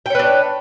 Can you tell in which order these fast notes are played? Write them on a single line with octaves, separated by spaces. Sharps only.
G5 C#5 B4 D4